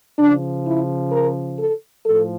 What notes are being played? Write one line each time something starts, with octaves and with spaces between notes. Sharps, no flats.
C#3 F3 D4
E4
A#4
A4
A2 F3 A4